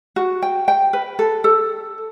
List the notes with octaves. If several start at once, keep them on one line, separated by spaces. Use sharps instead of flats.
F#4
G5
G5
B4
A4
A4